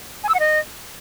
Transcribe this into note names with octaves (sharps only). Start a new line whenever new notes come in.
G#5
E6
F#5
D#5